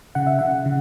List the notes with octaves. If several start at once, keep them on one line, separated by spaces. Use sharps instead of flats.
C#3 F#5
E5
C#3 F#5
C#3